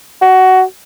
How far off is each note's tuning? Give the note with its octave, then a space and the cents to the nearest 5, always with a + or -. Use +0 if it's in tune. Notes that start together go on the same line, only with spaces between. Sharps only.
F#4 +15